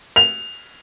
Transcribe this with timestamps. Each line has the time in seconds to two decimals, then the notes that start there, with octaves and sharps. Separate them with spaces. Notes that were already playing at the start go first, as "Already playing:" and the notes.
0.16 F7